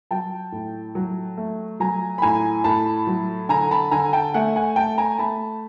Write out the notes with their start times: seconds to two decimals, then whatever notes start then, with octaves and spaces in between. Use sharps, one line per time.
0.11 F#3 G5 A5
0.52 A2
0.95 F#3
1.37 A3
1.80 F#3 G#5 A#5
2.18 B5
2.22 A2 G#5 A#5
2.64 A2 A5 B5
3.07 F#3
3.49 D3 G#5 A#5
3.71 A5 B5
3.91 D3 G#5 A#5
4.13 G5 A5
4.34 A3 F#5 G#5
4.56 F#5 G#5
4.76 A3 G5 A5
4.98 G#5 A#5
5.18 A3 A5 B5